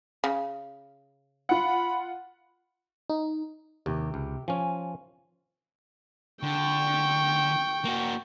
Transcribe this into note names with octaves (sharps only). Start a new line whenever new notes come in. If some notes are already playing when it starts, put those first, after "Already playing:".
C#3
F4 F#5 B5
D#4
D#2 C3 G4
C#2
F3 C#4 G#5
D3 G5 C#6
A#3 F#4